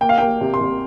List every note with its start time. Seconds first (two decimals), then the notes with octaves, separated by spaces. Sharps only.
0.01 A#3 G5
0.09 F5
0.18 A#3 G5
0.41 C3
0.54 C6
0.60 C3